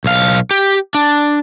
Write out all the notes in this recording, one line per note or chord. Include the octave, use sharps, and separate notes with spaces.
B1 F5
G4
D4